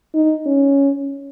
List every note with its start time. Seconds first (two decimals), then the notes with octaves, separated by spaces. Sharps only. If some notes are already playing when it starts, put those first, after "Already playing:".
0.14 D#4
0.46 C#4